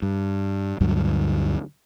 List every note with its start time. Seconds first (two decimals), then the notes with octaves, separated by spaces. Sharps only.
0.02 G2
0.80 D2 G2 D3 F#3